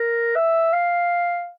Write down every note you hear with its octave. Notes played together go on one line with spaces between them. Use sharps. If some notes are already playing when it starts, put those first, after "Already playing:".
Already playing: A#4
E5
F5